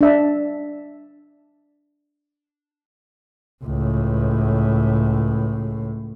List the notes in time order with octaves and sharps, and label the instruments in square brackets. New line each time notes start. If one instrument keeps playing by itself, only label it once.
[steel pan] D4 E5 A5
[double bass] C#2 A2